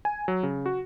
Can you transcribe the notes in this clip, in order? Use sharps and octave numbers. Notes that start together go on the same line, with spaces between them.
G#5
F#3
C#3
F#4